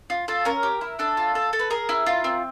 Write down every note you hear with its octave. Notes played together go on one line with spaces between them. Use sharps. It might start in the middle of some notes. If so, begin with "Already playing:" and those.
F4
F4 A4
C#4 A#4
G4
E4
D4 A4
F4
A4
A4
B4
G#4 A#4
E4
F4
C4